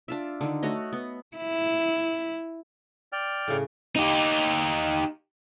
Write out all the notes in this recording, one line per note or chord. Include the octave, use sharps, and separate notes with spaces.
D4 F4 E5
D3 D#3
A3 F#4 C#5 D#5
B3
E4
D5 G5 F6
A2 C#3
D#4 G4